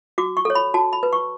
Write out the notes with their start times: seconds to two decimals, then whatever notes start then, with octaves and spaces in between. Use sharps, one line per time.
0.18 F#4 D6
0.37 C#6
0.45 A4 C#5
0.55 B5
0.74 F#4 A5
0.93 B5
1.03 B4
1.13 C#6